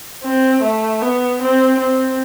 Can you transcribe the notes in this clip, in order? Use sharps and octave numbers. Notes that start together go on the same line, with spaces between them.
C4
A3
B3
C4
C4